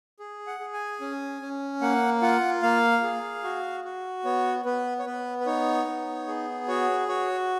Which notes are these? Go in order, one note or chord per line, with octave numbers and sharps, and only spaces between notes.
G#4
F#5
G#4
G#5
C#4
C#4
A#3 F#5
F4 F#5
A#3 F5
G#4
F#4
F#4
B3 C#5
B3 B4
C#5
B3 B4
B4
D#4 C#5
B3
G#4
F#4 C#5
F#4 C#5